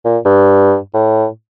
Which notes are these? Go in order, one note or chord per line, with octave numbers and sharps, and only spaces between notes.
A#2
G2
A2